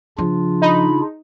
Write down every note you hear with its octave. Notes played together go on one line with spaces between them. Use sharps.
C#3 F3 D4 F4
D#4 B5